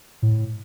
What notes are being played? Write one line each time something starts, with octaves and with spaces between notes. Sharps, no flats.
A2